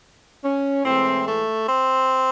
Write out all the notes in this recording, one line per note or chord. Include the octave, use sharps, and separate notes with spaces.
C#4
A2 E3 G#3 C4
A3
C4